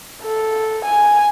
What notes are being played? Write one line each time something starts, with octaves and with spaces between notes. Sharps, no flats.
A4
G#5